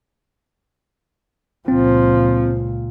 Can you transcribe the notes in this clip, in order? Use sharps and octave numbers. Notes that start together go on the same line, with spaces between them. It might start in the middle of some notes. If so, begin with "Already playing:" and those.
C#2 A#2 F3 C4